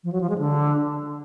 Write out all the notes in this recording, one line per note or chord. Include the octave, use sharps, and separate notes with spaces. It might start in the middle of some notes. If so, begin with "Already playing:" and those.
F3
F#3
F3
G#3
D3